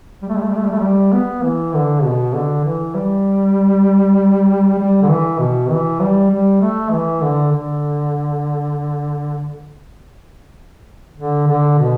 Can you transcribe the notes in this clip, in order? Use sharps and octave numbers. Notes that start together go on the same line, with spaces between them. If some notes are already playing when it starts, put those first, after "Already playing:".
G3
A3
G3
A3
G3
A3
G3
A3
G3
B3
E3
D3
B2
D3
E3
G3
G3
D3
E3
B2
E3
G3
G3
A3
E3
D3
D3
D3
D3
B2